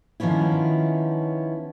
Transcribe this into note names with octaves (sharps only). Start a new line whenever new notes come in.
D#3 F3 B3 C#4 E4